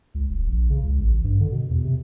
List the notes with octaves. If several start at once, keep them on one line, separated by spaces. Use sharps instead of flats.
C#2
D#1
A#1
C#3
C#2
A1
G2
D3
B2
E2
C3